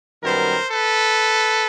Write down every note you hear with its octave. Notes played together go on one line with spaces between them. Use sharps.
F#2 D#3 G3 B3 A#4 C5
A4 B4